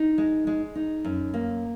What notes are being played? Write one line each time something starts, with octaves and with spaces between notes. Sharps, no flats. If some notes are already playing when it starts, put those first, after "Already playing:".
Already playing: D#4
G#3
G#3
D#4
F#2
A#3